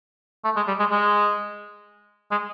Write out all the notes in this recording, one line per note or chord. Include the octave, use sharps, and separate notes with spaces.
A3
G#3
G3
G#3
G#3
G#3